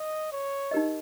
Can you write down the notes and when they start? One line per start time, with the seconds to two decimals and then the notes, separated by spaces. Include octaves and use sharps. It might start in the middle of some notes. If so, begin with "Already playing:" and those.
Already playing: D#5
0.32 C#5
0.71 D#4 G4 A#4 D#5